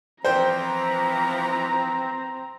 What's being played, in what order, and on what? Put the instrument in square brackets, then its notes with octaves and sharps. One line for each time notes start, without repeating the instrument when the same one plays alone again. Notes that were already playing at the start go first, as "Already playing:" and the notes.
[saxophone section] E3 F3 [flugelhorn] C4 [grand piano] C5 G5 G6 [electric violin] A#5